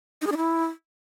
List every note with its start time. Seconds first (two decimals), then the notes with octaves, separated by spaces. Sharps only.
0.22 D#4
0.27 G#4
0.32 D4
0.37 E4